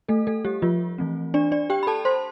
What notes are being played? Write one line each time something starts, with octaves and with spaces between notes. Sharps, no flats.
A3 A4
A3 A4
G3 G4
F3 F4
E3 A3 C4
D4 D5
D4 D5
G4 G5
B5
A4 A5
C5 C6